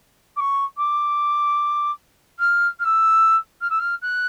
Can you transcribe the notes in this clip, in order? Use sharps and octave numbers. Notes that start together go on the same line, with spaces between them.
D6
C#6
D6
F6
F6
E6
F6
E6
F6
F#6